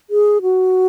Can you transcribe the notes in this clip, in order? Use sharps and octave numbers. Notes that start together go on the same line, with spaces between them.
G#4
F#4